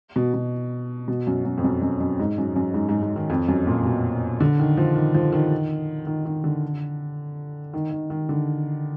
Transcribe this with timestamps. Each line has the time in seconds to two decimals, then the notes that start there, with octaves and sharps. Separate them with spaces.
0.16 B2
0.34 B2
1.08 B2
1.27 F#2
1.45 F#2
1.58 F2
1.64 F#2
1.82 F#2
2.00 F#2
2.19 G#2
2.38 F#2
2.56 F#2
2.74 G#2
2.89 G#2
3.02 G#2
3.16 D#3
3.30 F2
3.48 F#2
3.67 A#2
3.85 B2
4.40 D3
4.60 D#3
4.77 F3
4.96 D#3
5.14 F3
5.33 D#3
6.07 D#3
6.25 D#3
6.44 D3
7.74 D#3
7.91 D#3
8.10 D#3
8.29 D3